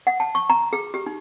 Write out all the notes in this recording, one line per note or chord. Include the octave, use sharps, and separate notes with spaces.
F#5
A5
C#6
A#5
G#4
G4
D#4